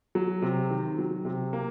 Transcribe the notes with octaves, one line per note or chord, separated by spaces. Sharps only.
F#3
C3
D#3
F#3
C3
A#3